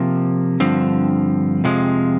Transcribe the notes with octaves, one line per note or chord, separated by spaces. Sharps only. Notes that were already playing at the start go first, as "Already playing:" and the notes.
Already playing: C3 F3 A#3
G2 D3 F3 C4
F2 C3 F3 G#3